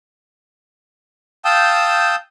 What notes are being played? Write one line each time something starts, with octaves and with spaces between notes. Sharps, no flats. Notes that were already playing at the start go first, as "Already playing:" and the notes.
F5 G5 A5 D#6 E6 G6